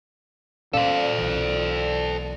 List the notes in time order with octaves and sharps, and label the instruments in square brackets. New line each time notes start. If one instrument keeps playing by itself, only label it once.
[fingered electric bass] A#2 C#4 [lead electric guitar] A4 C5 [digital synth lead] D5 [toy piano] F5
[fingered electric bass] B1 E3